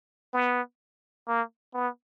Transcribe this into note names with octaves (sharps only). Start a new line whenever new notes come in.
B3
A#3
B3